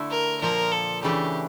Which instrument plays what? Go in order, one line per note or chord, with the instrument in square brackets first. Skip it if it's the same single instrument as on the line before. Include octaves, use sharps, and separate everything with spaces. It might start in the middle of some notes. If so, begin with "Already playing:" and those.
Already playing: [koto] D3 A3 E4
[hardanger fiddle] A#4
[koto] A#2 F3 A#3 [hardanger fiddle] A#4
[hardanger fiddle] A4
[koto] C#3 E3 A3 D4 [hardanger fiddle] G4